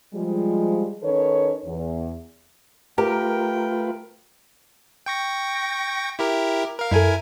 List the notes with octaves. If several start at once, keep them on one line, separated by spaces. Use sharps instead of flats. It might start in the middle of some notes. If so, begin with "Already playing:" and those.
F3 G3 G#3
D#3 C#4 A4 B4 C#5
E2
A3 F4 G4 A#4 B4 G5
G5 C#6 A#6
E4 G4 A#4
A#4 F5
F#2 E4 A4 A#4 G#5